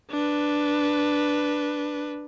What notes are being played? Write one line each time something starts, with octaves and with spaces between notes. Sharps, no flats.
D4 B4